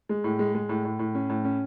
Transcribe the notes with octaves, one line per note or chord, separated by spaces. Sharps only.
G#3
A2
G#3
G#3
A2
A2
A2
C#4
A2
C#4